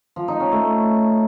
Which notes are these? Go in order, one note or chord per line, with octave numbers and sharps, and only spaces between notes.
F3
D#4
C#4
A3